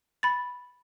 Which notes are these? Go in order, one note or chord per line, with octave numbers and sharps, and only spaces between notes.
B5 A6